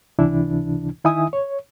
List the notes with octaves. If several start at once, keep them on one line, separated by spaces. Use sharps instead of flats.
C#2 C3 E3 D4 E4
D#3 D#4 E4 E5 G#5 D#6
C#5